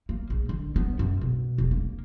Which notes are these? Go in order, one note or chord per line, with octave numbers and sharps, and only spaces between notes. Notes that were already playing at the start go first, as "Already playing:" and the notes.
A#3
A#1
D3
B3
F#2
B2
E1
A#3